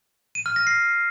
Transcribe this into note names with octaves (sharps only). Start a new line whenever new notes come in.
D#7
F6
A#6
C7